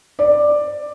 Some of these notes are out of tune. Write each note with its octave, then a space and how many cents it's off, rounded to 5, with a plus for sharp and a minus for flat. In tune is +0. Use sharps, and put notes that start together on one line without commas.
D5 +10